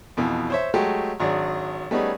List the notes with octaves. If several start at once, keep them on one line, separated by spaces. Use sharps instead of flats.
F2 B2 E3
C5 C#5 E5
F#3 G#3 A3 G4
G#1 F#3 D4 G#4
G3 A3 B3 C#4 D#4 G#4